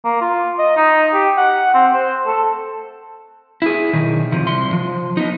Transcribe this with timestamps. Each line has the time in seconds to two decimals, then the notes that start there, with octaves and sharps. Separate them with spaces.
0.04 A#3
0.21 F4
0.59 D#5
0.77 D#4
1.14 G4
1.37 F#5
1.74 C4
1.94 C5
2.27 A4
3.62 E4 G#4
3.93 B1 D#3
4.32 C3 F3
4.47 C2 C6
4.73 F3
5.17 B3 D#4